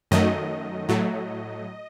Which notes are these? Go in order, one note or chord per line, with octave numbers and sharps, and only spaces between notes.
F#2 D#3 F#3 A3 D#5
A2 F#3 A3